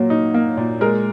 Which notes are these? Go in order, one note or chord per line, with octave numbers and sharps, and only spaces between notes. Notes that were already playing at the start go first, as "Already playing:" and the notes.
Already playing: A#2 F#3 A#3
D#4
A#3
A#2
G#3 A#4